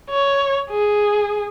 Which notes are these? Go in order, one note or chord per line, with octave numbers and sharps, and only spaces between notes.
C#5
G#4